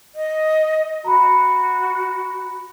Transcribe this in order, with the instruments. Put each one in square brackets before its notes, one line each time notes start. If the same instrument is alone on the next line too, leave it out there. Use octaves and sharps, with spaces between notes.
[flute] D#5
[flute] F#4 [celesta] A#5 B5